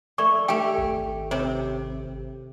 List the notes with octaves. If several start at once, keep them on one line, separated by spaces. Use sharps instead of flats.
A3 D5 C#6
A3 G4 G5
G#1
C3 C#5